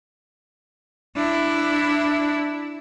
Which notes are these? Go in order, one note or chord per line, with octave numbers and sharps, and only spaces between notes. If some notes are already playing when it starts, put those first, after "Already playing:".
D4 E4